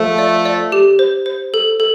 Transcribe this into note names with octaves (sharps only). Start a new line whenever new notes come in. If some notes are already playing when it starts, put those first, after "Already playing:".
Already playing: F3 A3
D5
D5
G4
C5
C5
A4
A4